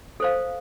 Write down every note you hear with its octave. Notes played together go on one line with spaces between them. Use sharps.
A4 C5 F5